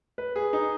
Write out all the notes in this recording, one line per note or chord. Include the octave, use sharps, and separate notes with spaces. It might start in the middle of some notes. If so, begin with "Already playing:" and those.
B4
G#4
D#4